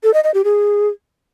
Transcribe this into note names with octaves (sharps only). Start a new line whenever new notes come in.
A4
D#5
D#5
G4
G#4